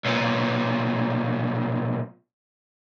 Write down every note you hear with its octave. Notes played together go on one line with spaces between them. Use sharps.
B1 A#2